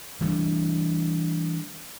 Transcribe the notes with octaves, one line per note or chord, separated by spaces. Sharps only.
E3 G3 A3 D4